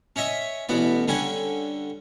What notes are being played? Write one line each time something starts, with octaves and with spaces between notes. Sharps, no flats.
C#4 C#5 D#5 E5
A1 B2 B3 D5
D3 G3 C#4 G#5